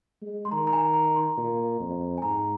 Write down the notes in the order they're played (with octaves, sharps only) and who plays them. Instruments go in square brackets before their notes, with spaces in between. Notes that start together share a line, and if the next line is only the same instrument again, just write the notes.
[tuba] G#3
[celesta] C6
[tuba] D#3 [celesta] A#5
[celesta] A#5
G#5
A#5
A#5
C6
[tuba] A#2
F2
[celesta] G#5
[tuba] G#2 [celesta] A#5